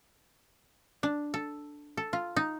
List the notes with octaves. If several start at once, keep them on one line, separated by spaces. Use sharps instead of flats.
D4
A4
A4
F4
D#4